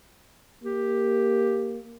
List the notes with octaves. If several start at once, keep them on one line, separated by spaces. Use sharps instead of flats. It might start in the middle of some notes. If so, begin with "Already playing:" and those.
A#3 G4